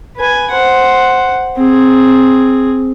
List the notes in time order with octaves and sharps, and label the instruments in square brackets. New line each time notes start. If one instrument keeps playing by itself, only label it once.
[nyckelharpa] B4 G#5
C5 F#5
C4 G#4